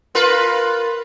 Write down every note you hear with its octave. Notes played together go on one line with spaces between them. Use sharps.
F4 A#4 B4